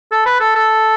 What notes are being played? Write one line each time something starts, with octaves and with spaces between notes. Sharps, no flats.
A4
B4
A4
A4